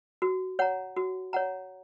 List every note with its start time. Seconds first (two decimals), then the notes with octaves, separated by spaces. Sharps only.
0.22 F#4
0.59 C#5 F#5 A#5
0.97 F#4
1.33 C#5 F#5 A#5